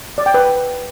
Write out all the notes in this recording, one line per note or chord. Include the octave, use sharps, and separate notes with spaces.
D5
G5
B4